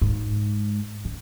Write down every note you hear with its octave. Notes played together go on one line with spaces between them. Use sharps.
G#2
C#3